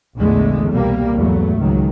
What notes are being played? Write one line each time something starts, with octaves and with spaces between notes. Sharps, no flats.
A#1 E2 D3 G#3 A3
C2 B2 G3 A#3
E2 G#2 F#3 A3
C#2 D#3 F#3